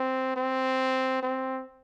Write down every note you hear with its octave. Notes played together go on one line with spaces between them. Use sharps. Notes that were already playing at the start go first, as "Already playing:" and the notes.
Already playing: C4
C4
C4